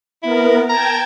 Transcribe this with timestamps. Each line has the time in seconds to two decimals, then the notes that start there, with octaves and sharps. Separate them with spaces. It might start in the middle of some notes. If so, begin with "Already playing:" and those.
0.23 B3 E4 A#4
0.69 G5 A5 A#5 G#6